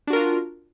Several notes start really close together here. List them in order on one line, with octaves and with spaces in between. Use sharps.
D4 F#4 A#4 F4